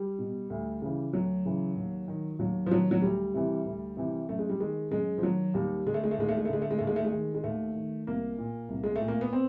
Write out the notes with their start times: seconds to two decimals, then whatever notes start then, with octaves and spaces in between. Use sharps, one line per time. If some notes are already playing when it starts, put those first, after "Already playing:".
Already playing: G3
0.19 B2
0.50 D2
0.82 C#3 E3
1.13 D2 F#3
1.45 C#3 E3
1.76 D#2
2.08 D#3
2.39 D#2 F#3
2.66 F3
2.70 D#3 F#3
2.91 F#3
3.02 D2 G3
3.34 C3 E3
3.65 D2
3.97 C3 E3
4.29 F#2 A3
4.39 G#3
4.49 G3
4.60 D#3 G#3
4.91 F#2 G#3
5.18 F3
5.22 D#3 F#3
5.54 D#2 G3
5.86 D3 G#3
5.94 A3
6.04 G#3
6.11 A3
6.18 D#2 G#3
6.28 A3
6.37 G#3
6.45 A3
6.49 D3 G#3
6.62 A3
6.71 G#3
6.78 D#2 A3
6.87 G#3
6.96 A3
7.05 G#3
7.12 D#3
7.34 G#3
7.44 D#2 A3
7.75 D#3
8.07 C2 A#3
8.38 A#2
8.69 C2
8.84 G#3
8.96 A3
9.01 A#2
9.08 A#3
9.21 B3
9.33 C4